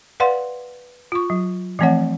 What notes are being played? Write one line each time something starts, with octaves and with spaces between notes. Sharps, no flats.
B4 D5 F5 F#5 C6
F4 C#6
F#3
E3 F3 A3 C4 C#5 F#5